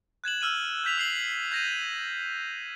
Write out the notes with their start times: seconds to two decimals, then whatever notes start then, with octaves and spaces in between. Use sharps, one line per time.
0.24 F#6 G#6 E7 F#7
0.41 E6 F6 D#7 F#7
0.84 F6 G6 B6 F7
0.98 E6 C7 F#7
1.52 G6 G#6 A#6 C7 D#7